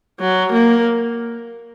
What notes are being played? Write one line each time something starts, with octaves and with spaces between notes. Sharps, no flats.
F#3
A#3